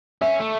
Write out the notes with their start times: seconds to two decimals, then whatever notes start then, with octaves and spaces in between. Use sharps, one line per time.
0.21 C#4 E5
0.40 A3